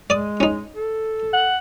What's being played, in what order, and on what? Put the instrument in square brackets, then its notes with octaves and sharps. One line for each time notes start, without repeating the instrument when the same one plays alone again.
[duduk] G#3 [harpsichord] D5 D#6
[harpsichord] C#4 D#4
[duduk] A4
[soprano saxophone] F#5